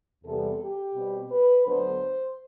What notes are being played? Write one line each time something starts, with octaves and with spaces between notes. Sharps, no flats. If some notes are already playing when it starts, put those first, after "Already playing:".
E2 C3 G3 B3 A4
G4
B2 G3 C4
B4
D2 D3 F#3 B3 C5